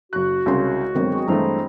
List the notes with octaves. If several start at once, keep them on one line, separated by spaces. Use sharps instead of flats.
F#1 F#4 F#6
C2 C#3 G#3 C#5 C6
G1 D#3 F#3 G#3 C4
G#4
G2 E3 A3 E4 C5 A#5